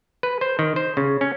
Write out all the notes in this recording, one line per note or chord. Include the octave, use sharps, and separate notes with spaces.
B4
C5
D#3
C5
C#3
C#4